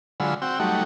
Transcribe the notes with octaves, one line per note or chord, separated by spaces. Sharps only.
D3 F#3 G#3 F4 B5 E6
C4 F#4 G5 E6
F#3 G3 A3 D#4 F#4